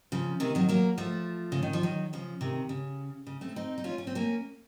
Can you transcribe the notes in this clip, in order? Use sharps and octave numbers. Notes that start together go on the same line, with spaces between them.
C#3 F3
C3 D#3
D#3 F#3
F#3 A#3
F3 A3
C#3
D#3
F3
D#3 F#3
C#3 F3
C3 D#3
C#3
C#3
A3 C4
C4 D#4
D#4
C#4 F4
C#4
C4
A#3 C#4